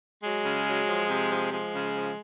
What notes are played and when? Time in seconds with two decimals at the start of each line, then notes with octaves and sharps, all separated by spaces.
0.23 F#3 G#3
0.45 C#3
0.66 F#3
0.88 F3
1.09 C3
1.30 F3
1.52 F3 G#3
1.74 C#3
1.95 F3